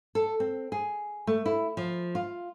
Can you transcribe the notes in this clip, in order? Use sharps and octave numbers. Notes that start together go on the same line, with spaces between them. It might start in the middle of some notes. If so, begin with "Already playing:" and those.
A4
C4
G#4
A3
E4
F3
F4